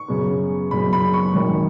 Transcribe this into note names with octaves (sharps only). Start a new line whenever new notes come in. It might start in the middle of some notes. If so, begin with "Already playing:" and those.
Already playing: C#6
F#2 C#3 B3
F#1 F#2 C#3 F#3 B3 B5
B5
C#6
G#1 F#2 D#3 F#3